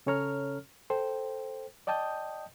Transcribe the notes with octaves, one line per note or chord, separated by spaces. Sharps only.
C#3 C#4 A4 C#5 A#5 F6
A4 C5 G5
D5 D#5 G5 A5 D#6 G6